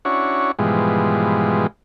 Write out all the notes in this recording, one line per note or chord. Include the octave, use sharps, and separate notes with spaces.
C#4 D4 E4 F#4 C#5
G#2 B2 E3 F3 G3 G#3